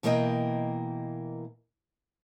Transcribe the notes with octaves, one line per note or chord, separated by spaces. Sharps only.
B2 E3 A#3 A#4 D#5 G5